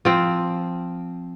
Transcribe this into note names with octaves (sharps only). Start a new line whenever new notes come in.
F3 C4